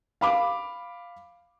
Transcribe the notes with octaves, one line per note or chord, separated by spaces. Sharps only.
F5 B5 D6